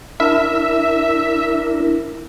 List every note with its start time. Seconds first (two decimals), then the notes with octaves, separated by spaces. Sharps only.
0.20 D4 E4 A#4 E5